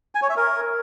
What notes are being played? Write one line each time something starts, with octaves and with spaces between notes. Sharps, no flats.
G#5
C#5
E5
A#4